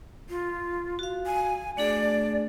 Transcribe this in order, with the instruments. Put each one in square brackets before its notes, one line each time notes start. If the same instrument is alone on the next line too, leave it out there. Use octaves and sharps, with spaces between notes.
[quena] F4
[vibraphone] F#4 F5
[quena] G#5
[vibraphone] A3 D4 G#4 [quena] D5